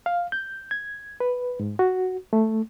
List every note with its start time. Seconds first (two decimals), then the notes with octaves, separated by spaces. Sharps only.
0.06 F5
0.32 G6
0.71 G#6
1.20 B4
1.60 G#2
1.79 F#4
2.33 A3